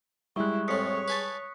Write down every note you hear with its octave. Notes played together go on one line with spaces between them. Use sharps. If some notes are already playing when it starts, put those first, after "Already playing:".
G3 G#3 E4 C#6 F#6
F2 A2 C#5 D#6 B6 C#7
B4 G#5 A5